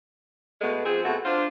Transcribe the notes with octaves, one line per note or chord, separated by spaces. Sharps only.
B2 G#3 A3 B3
F3 C4 G#4
B2 A3 C4 F#4
D4 F4 C5